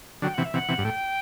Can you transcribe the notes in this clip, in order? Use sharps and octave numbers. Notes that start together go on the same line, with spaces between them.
D3 F#3 G5
C3 E3 F#5
E5
C3 E3 F#5
C3 E3
G2
A2 G5